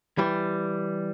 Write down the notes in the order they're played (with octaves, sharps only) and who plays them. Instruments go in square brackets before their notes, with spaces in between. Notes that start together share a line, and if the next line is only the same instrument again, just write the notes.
[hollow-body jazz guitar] E3 G3